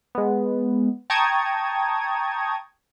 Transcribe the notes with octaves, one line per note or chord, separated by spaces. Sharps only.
G#3 B3
G5 A5 A#5 C#6 D#6 G#6